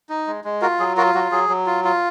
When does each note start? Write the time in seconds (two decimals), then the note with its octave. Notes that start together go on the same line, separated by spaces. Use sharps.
0.09 D#4
0.27 G#3
0.44 G#3
0.62 F4 F#4 A#4
0.79 F#3 G#4
0.97 F4 F#4 A#4
1.14 F#3 F#4
1.32 F#3 G#4
1.49 F#3
1.66 F4
1.84 F4